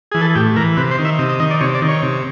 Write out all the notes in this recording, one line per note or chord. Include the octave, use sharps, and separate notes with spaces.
E3 G#4
A4
A2 G4
E3 A#4
C3 B4
C5
D#3
E5
C3 D#5
D#5
D#3 D#5
D5
C3 C#5
D5
D#3
C#5
C3